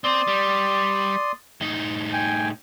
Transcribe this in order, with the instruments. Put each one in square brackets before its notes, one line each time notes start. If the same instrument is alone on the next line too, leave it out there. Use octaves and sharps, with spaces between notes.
[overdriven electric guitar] C4 C5 [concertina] D5 C6 D#6
[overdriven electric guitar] G3
A2 D#4
[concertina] G5 G#5